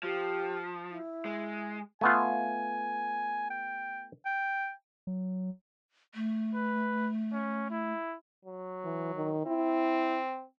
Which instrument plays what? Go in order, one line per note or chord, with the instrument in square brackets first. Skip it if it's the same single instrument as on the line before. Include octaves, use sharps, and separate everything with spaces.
[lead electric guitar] F3 [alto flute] G4
[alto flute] E4
[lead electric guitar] G#3
[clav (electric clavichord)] A3 B3 F4 [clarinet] G#5
[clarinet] G5
G5
[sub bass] F#3
[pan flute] A3
[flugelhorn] B4
C#4
E4
[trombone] F#3
[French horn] E3
D#3
[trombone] C4 [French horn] E4